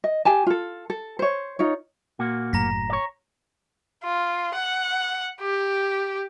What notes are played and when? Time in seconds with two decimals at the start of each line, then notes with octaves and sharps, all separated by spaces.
0.04 D#5
0.25 G4 G#5 A5
0.47 F4 A4
0.90 A4
1.19 C5 C#5
1.59 D#4 F4 C#5
2.19 A#2 A#3 F#4
2.53 F#1 F#2 A2 A#5 A#6 B6
2.90 C#5 D5
4.04 F4
4.55 F#5
5.41 G4